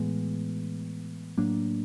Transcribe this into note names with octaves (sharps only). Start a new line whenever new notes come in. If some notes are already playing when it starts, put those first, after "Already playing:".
Already playing: A2 E3 G#3 B3
A2 F#3 A#3 D4